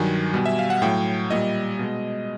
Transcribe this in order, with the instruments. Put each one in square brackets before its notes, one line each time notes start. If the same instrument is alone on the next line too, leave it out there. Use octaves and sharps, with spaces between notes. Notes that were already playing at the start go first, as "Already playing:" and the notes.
Already playing: [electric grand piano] G2 D#3 F#3 G#5
B2 G3
E5
F5
F#5
A2 F#3 G5
A#2 G3 D#5
B2 G#3